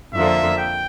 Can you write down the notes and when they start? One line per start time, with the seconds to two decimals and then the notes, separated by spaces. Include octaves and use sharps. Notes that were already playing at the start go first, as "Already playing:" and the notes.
0.13 F2 D3 F3 A#3 E5
0.58 G5